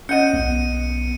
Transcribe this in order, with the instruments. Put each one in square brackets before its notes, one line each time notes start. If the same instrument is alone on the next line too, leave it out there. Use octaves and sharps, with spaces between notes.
[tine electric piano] C#4 [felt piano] D#5 F#5 G6 [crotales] C#7 D#7
[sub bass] B1 [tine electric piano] B3